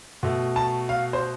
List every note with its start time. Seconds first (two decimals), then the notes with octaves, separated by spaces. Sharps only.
0.23 B2 A3
0.56 A5
0.89 F5
1.13 C5